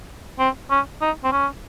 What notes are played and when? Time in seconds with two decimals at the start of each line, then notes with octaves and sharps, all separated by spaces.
0.39 C4
0.70 C#4
1.01 D#4
1.24 C4
1.32 C#4